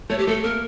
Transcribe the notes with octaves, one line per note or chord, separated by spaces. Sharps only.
A3 C#5
G4
A3 A4
A#3 A#4